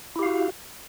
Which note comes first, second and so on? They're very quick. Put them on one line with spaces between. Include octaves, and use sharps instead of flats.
E4 G4 F5 F#4